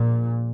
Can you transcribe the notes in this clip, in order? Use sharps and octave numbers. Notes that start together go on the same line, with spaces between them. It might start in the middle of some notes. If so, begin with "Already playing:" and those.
Already playing: A#1 A#2